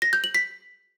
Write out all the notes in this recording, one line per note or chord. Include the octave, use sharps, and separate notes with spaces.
A#6
G6
F#7
B6